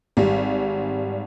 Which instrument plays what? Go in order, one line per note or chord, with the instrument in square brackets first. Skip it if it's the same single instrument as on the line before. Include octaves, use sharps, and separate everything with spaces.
[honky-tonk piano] G#1 G3